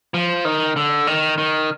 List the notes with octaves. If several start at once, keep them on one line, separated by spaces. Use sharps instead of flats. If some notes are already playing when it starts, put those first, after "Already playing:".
F3
D#3
D3
D#3
D#3